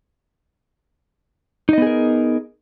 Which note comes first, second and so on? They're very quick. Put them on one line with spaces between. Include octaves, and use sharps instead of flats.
D#4 D#5 B3 G#4 A#4